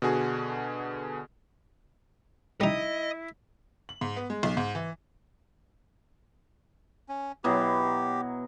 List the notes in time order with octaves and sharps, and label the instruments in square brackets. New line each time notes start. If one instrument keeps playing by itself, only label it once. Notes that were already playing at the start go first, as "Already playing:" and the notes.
[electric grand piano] B2 D3 F#4 G#4
[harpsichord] G3 D#4 [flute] E4 [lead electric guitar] D#5
[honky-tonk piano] F#7
G#2
B3
G#3
B1
G#2
E3
[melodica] C#4
[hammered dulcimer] B2 E3 F#3 [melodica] G4